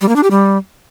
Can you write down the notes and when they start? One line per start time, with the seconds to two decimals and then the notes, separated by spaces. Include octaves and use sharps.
0.01 G3
0.09 A#3
0.16 D4
0.23 G4
0.31 G3